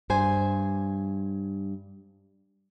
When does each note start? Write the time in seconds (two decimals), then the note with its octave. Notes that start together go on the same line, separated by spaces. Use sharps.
0.10 G2 C5 G#5